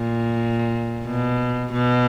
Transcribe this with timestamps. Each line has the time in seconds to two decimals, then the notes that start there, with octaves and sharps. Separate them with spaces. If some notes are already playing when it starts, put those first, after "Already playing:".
Already playing: A#2
1.07 B2
1.72 B2